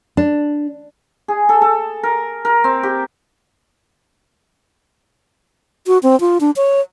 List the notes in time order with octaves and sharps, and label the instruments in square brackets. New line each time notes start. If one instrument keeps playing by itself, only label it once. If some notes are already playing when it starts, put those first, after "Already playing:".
[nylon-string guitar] D4
[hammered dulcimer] G#4
A4
A4
A#4
A#4
C4
G4
[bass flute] F#4
C4
F4
D4
C#5